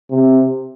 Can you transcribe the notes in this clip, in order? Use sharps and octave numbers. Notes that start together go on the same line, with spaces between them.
C3